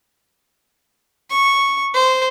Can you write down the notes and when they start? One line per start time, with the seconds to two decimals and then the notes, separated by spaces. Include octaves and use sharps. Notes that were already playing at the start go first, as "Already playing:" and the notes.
1.30 C#6
1.94 C5